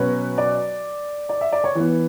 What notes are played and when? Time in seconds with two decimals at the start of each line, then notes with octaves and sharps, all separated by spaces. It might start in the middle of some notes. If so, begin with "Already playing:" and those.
Already playing: B2 F#3 C#4 B4
0.38 D5
1.29 D5
1.41 E5
1.52 D5
1.64 C#5
1.75 E3 B3